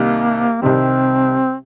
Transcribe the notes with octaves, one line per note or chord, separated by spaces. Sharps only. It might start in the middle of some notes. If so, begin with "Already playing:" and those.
Already playing: C2 C3 D#3 G3 A#3
C2 C3 D#3 G3 C4